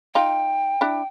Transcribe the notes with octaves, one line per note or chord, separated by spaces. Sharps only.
D#4 F4 G5
D4 E4